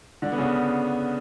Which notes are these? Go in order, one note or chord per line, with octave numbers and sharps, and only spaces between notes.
D3 D4
B3
C#3 C#4